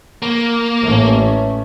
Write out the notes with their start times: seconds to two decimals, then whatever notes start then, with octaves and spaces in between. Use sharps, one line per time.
0.22 A#3
0.81 A1 A3 C#4